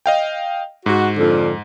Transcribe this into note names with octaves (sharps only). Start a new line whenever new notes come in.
D#5 F5 G5
G#2 F#4
F2 D3